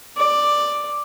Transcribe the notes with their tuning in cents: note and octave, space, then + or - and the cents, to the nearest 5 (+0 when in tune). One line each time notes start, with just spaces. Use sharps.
D5 +5